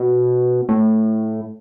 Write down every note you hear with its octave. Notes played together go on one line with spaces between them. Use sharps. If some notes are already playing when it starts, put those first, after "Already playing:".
Already playing: B2
A2